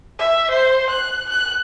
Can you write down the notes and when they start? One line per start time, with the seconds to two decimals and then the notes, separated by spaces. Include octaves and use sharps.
0.19 E5
0.51 C5
0.90 F#6
1.30 F#6